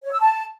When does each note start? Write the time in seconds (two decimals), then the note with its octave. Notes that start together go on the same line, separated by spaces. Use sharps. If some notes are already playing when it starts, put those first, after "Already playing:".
0.04 C#5
0.12 E6
0.21 A5